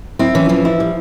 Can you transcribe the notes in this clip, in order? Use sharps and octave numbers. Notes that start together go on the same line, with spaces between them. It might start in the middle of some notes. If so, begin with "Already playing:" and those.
C4 E4
E3 C#4
E3 F3
E4
G3